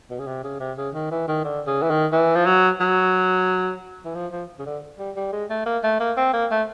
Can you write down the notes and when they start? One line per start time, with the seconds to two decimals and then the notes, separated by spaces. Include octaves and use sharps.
0.10 B2
0.19 C#3
0.27 C3
0.44 C#3
0.60 C3
0.77 C#3
0.95 D#3
1.11 E3
1.28 D#3
1.44 D3
1.67 C#3
1.82 E3
1.90 D#3
2.13 E3
2.36 F3
2.46 F#3
2.80 F#3
4.05 E3
4.15 F3
4.32 F3
4.59 C#3
4.66 D3
4.99 G3
5.17 G3
5.33 G#3
5.50 A3
5.66 A#3
5.83 A3
6.00 A#3
6.17 C4
6.33 A#3
6.51 A3